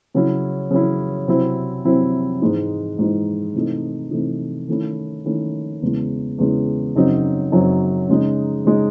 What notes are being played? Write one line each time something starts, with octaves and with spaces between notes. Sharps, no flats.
C#3 F#3 C#4 E4
C#3 F#3 C#4 E4
C3 F#3 C4 E4
C3 F#3 C4 E4
G#2 E3 G#3 D#4
G#2 E3 G#3 D#4
C3 E3 A3 D#4
C3 E3 A3 D#4
D#3 A3 C#4 E4
D#3 A3 C#4 E4
E2 C#3 E3 G#3
E2 C#3 E3 G#3
F#2 C#3 F#3 C4 D#4
F#2 C#3 F#3 C4 D#4
C#3 G#3 D#4
C#3 G#3 D#4